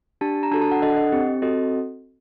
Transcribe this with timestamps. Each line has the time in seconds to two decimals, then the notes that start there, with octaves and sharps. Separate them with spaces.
0.21 D4 G4 A5
0.43 A#5
0.51 D4 F#4 A4 A5
0.62 A5
0.72 F#5
0.82 D4 A4 D#5
0.89 F#5
0.96 D#5
1.12 C4 G4
1.42 C4 F#4 A4 D#5